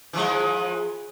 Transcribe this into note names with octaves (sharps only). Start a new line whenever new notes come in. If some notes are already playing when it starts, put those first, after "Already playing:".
E3 F3 G#3